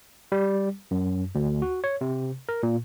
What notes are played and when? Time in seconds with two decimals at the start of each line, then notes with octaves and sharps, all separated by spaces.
0.32 G3
0.91 F#2
1.35 D2
1.62 F#4
1.84 C#5
2.01 C3
2.49 A#4
2.63 A#2